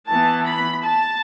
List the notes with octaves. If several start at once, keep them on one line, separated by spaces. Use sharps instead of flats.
E3 B3 A5
B5
A5